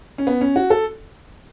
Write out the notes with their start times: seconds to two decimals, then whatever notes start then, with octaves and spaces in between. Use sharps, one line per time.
0.18 C#4
0.27 B3
0.41 C#4
0.56 F#4
0.70 A4